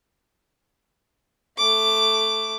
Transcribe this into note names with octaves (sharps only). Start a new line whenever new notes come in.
A3 D6